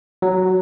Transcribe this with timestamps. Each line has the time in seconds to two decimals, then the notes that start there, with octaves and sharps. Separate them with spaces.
0.22 F#3